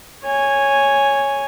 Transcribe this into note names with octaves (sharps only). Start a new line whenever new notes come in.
C#5 G#5